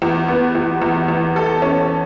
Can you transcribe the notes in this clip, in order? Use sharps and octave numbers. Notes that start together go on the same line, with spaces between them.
E2
B3
E2
E2
E2
A4
C#4